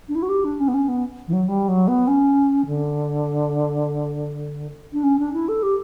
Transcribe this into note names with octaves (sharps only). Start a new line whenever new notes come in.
D4
E4
F#4
G4
D4
C#4
B3
C#4
B3
E3
F#3
G3
F#3
B3
C#4
D3
D4
C#4
D4
E4
A4
G4